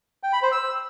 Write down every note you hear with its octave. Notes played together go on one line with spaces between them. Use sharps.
G5
B5
C5
E6